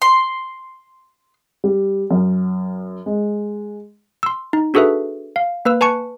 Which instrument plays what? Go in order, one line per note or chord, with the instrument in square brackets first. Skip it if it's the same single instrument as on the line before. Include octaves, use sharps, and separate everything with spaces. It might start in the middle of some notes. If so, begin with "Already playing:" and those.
[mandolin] C6
[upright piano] G3
F#2
G#3
[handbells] C6 E6
D#4
D4 F#4 G#4 A4 B4 E5
F5
A#3 B4 E6
B4 G#5 A5 C#6 C#7